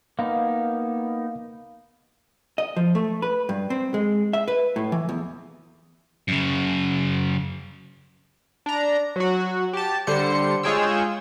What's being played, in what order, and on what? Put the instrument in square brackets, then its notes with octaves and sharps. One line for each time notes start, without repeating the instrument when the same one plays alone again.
[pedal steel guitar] A#3 B3 D#4 [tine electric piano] F5
[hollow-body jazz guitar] D#5
F3
A3
B4
G2
C4
G#3
E5
B4
A2
E3
E2
[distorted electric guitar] F#2 C#3
[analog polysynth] D4 A#5
F#3 F#4
G4 A5
D3 G3 C5 C#7
G#3 F4 G#4 C#5 G5 E6